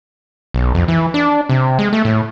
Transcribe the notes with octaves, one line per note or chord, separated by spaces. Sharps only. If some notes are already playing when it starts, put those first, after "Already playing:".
B1
F2
E3
D4
C3
G#3
A3
A2